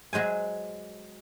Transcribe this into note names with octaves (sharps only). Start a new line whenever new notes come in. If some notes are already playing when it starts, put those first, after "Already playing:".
F#3 G#3 C5 G#5